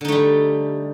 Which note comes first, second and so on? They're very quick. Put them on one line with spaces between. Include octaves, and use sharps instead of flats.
D3 D#4 A3 G3